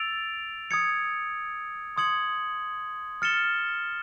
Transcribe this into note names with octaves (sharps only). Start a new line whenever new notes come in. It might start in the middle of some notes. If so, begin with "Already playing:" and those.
Already playing: E6 A6 D7 F7
D#6 G#6 C#7
C6 D#6 G#6 C#7 F#7
F6 A6 C#7 E7 G7